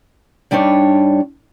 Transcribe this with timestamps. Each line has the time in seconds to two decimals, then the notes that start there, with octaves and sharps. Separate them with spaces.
0.51 G2 G3 D4 D#4 C#5